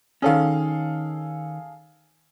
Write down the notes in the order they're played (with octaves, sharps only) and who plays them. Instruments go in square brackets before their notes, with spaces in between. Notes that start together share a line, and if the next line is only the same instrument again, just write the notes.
[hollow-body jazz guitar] D#3 C#4 [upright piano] G#4 A4 F5